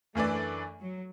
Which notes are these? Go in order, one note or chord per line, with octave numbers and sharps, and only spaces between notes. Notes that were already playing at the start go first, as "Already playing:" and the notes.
F#2 E3 A3 D4 B4 D5
F#3